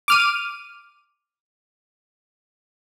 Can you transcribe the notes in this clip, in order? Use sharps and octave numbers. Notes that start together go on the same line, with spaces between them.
D6 F6 D#7